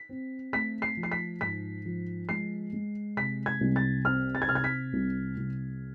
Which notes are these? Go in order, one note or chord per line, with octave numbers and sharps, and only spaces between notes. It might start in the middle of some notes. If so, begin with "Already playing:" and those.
Already playing: B6
C4
A3 B6
C7
F3
C7
B6
G#2 B6
F3
G#3 C7
G#3
C3 B6
G#6
C2
A6
C4 F6
A6
G#6
C3 F6
G#6
B6
C2
C2